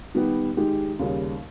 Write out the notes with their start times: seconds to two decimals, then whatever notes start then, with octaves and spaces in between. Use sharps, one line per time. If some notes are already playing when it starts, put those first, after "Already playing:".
0.15 D#3 G3 B3 G4
0.57 D#3 G#3 D#4 G4
0.99 D#2 C#3 G3